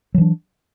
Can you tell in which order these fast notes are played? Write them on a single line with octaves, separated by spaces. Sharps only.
F#3 E3 D4